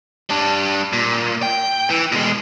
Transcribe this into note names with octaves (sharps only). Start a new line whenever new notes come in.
G3 D4
A#2
G5
E3
B2 G#3